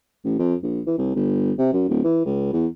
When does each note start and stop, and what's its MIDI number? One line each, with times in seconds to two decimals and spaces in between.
0.24 0.35 33
0.39 0.55 41
0.63 0.81 34
0.86 0.97 52
0.98 1.13 36
1.15 1.52 31
1.58 1.70 48
1.73 1.88 42
1.89 1.99 26
2.04 2.23 52
2.26 2.53 37
2.53 2.66 40